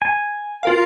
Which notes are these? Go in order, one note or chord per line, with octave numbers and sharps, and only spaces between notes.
G#5
F4 A#4 F5